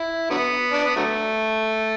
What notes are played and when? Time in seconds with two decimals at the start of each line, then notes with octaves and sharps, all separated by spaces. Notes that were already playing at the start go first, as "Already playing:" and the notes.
Already playing: E4
0.30 D3 F#3 B3
0.72 D4
0.85 B3
0.96 D3 F#3 A3